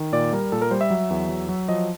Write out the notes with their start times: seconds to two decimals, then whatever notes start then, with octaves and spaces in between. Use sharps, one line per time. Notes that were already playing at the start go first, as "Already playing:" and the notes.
Already playing: D#3
0.13 A#2 D5
0.33 G3 A#4
0.52 A#2 A4
0.62 A#4
0.71 G3 C5
0.81 E5
0.90 F#3
1.10 E2
1.29 F#3
1.49 F#3
1.68 F3 D#5